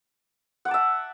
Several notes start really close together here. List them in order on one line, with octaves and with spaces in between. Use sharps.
F#5 D6 A5 E5